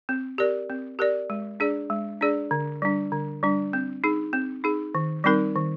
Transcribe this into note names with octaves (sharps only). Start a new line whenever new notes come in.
C4
G4 A#4 D5
C4
G4 A#4 D5
G#3
D4 G#4 D5
G#3
D4 G#4 D5
D3
G3 D4
D3
G3 D4
C4
D#4 G#4
C4
D#4 G#4
D#3
G3 C4 D#4 A#4
D#3